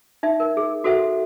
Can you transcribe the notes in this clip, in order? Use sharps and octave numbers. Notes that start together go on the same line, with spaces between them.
D#4 E5
A#4
G#4
F#4 A4 C5 E5 F#5